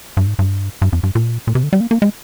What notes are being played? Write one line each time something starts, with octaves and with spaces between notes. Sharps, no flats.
G2
G#2
G2
G2
F2
G2
A#2
A#2
C3
D3
G3
A#3
A#3
G#3